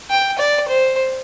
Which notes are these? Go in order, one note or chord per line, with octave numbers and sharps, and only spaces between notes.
G5
D5
C5